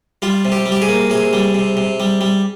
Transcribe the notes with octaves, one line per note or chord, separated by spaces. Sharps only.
G3 F4
C3
G4
G3
G4
G#4
A#3
C3 G#4
G3
C3
C3
G3
G3